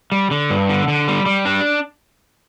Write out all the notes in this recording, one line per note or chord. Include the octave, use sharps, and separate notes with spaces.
G3
D3
G2
D3
D3
G3
G3
D4